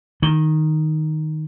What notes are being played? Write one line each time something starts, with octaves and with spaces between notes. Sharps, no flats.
D#3